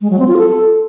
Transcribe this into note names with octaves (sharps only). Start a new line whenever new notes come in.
G#3
F#3
C4
F4
A4